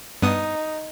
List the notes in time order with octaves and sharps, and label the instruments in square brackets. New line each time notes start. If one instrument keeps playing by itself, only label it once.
[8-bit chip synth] G2 B3 D#6 [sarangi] D#4